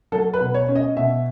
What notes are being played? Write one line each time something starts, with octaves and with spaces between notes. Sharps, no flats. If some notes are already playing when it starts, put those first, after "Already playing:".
F#3 A4
B4
B2
C#5
C#4
D#5
B2 E5